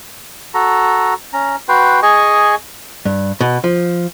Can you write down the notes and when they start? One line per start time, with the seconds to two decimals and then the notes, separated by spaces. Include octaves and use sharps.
0.54 F#4 A4 A#5
1.33 C#4 A#5
1.68 F#4 B4 G5 C6
2.02 G#4 D#5 G#5 C#6
3.05 G2
3.41 B2
3.64 F3